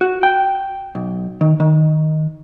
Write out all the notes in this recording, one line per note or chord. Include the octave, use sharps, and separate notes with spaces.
F#4
G5
B1
D#3
D#3